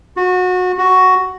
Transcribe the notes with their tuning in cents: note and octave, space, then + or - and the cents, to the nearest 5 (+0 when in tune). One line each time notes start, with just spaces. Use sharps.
F#4 -25
F#4 +5